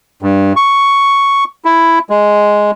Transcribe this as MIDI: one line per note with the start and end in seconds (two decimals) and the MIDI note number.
0.23 0.53 43
0.56 1.44 85
1.65 1.99 64
2.10 2.71 56